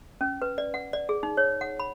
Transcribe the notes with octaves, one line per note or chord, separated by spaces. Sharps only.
C#4
B4
D5
F#5
D5
G#4
D#4
C#5
F#5
B5